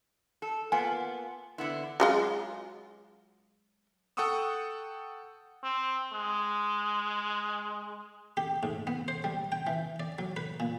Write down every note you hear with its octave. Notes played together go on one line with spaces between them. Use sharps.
A4
A#3 B3 F4 G#5
D3 B3 E4
F#3 G#3 F4
A4 F#5 G5 C#6 D#6 E6
C4
G#3
G4
G#2
B3
C5
G3
G5
E3
D5
F#3
B4
A#2